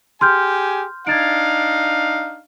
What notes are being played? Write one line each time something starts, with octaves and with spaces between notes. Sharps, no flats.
G4 G#4 G#5 C6 F6 G6
D4 D#4 F5 G#6 A6 D7